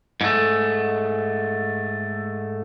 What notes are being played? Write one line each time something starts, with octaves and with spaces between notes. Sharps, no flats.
G#2 A3